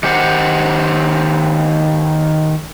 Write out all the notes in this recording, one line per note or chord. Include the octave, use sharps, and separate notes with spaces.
D#3 G4 C5 F#5